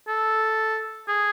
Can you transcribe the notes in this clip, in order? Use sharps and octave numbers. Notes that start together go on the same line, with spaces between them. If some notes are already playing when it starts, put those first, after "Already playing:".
A4
G#4